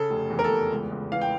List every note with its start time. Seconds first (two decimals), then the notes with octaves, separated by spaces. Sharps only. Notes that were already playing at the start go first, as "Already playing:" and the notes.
Already playing: C#3 A4
0.10 F1
0.30 E2
0.39 A#4
0.44 A4
0.50 E2
0.71 C#2
0.91 C#2
1.12 E3 F5
1.21 G5